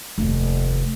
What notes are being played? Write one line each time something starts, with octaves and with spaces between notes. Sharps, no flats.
F1 D#2